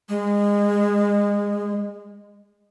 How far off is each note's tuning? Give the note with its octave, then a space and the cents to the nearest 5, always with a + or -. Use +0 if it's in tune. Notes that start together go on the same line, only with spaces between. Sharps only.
G#3 -25